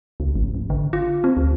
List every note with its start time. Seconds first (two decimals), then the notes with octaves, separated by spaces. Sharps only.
0.20 C#2
0.35 G#1
0.55 G#1
0.70 D3
0.93 F4
1.24 C4
1.37 D2